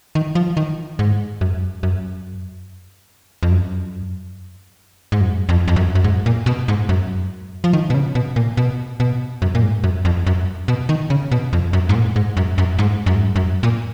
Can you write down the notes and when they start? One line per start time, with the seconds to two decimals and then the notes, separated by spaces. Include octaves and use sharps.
0.15 D#3
0.35 F3
0.57 D#3
0.99 G#2
1.41 F#2
1.83 F#2
3.43 F2
3.52 F#2
5.12 G#2
5.21 F#2
5.49 F2
5.68 F2
5.76 F#2
5.95 F#2
6.04 G#2
6.26 A#2
6.46 B2
6.68 G#2
6.89 F#2
7.64 F3
7.73 D#3
7.90 B2
7.94 C#3
8.15 B2
8.36 A#2
8.57 B2
9.00 B2
9.42 F#2
9.55 A#2
9.63 G#2
9.84 F#2
10.05 F2
10.27 F#2
10.68 B2
10.89 D#3
11.10 C#3
11.32 B2
11.53 F2
11.73 F#2
11.89 G#2
11.95 A#2
12.16 G#2
12.37 F#2
12.58 F#2
12.79 G#2
13.06 F#2
13.15 G#2
13.24 F#2
13.36 F#2
13.63 A#2